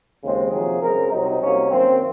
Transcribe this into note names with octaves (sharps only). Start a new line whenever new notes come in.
D#2 C#3 G#3 C4
F2 C3 D#3 F#3 A#3 G#4
F#2 C#3 G#3 C4 A#4
C2 C3 F#3 C4 D#4
C2 C3 F#3 A#3 C#4
F#2 D#3 A#3 C4